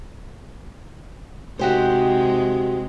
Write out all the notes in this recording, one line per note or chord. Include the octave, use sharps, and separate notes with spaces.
C3 D#3 G#3 F#4 G4 C5